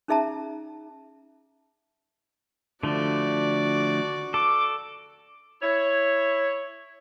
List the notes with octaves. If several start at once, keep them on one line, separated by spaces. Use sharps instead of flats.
C#4 D#4 G#4 E5 A5 A#5
D3 F3 A3 F#4 D5
A4 D6
E4 C#5